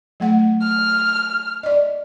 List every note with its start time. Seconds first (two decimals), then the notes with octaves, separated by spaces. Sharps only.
0.20 F#3 A3 F#5
0.62 F6
1.63 D5 D#5